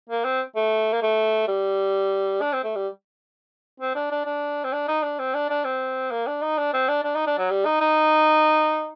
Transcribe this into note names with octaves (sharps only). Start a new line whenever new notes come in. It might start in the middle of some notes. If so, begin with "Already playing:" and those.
A#3
C4
A3
A#3
A3
G3
D4
C4
A3
G3
C4
D4
D4
D4
C4
D4
D#4
D4
C4
D4
D4
C4
A#3
D4
D#4
D4
C4
D4
D4
D#4
D4
F#3
G3
D#4
D#4